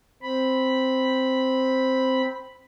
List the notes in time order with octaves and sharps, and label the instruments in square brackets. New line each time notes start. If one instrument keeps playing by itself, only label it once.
[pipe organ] C4 B5